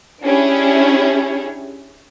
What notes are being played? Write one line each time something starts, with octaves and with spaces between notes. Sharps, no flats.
C#4 D4 E4 G4 G#4 C#5